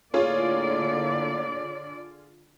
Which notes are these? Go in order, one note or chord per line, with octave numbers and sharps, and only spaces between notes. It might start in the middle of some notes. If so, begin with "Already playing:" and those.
A2 D3 A#3 F4 G#4 C#5 D5